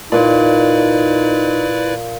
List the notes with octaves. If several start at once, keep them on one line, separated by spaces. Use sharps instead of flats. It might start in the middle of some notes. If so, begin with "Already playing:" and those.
A#2 D#4 E4 B4 D5